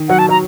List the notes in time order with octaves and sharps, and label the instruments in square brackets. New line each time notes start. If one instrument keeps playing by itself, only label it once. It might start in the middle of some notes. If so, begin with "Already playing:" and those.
Already playing: [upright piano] D#3
[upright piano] F#3 [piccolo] F#5
[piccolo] A5
[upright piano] F#3 [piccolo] A#5